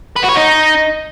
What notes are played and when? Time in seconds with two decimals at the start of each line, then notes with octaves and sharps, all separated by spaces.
0.16 B4
0.23 F#4
0.29 C#5
0.35 D#4